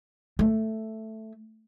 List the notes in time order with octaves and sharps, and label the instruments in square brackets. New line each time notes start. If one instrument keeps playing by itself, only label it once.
[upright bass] A3